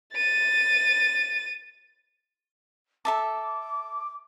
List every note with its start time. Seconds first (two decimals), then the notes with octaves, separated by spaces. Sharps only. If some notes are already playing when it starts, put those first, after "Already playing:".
0.14 A6 D#7
3.05 A4 E5 A5 D6